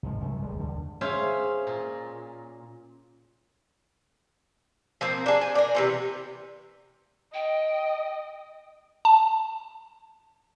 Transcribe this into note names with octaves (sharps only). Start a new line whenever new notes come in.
C2 G#2 F3
C2 F#2 A3
D1 G3 G#3
D#2 D3
C#4 G#4 C5 E5 F5 G#5
A#2
F3 A#3 C4
D4 G#4
G#5
A#4 D5
C3 E3 C4
D#5 G5
A5